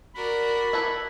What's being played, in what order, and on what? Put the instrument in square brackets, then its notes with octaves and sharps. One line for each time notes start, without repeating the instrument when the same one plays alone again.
[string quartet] F#4 A#4 D5 [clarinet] B5
[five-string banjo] E4 A4 B4